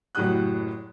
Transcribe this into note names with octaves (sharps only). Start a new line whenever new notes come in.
F#1 A2 F#3 G4 D#6 F#6